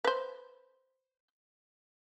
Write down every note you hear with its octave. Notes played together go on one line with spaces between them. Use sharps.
B4 C5